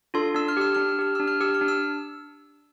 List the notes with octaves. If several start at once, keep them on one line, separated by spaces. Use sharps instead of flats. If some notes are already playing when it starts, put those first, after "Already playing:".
D4 F4 A4 C6
D4 E6
F6
G4 E6
D4 F6
E6
G4 F6
D4 E6
F6
G4 E6
F6
D4
E6